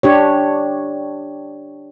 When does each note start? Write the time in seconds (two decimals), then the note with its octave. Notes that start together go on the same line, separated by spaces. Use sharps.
0.03 D4 G4 C#5